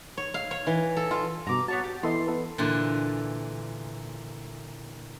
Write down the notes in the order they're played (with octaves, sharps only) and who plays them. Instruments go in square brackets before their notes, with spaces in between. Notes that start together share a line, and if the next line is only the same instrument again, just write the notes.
[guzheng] C#5
F5
C#5
E3
A4
F4
[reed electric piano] G2 B2 [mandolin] A#5 D6
[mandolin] B3 C#5 A5 [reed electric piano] F#4
[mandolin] G4
[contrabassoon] E3 [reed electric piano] B3 A4 D#5 [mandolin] C6
[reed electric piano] B3 A4 B4
[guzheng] A#2 D3 E3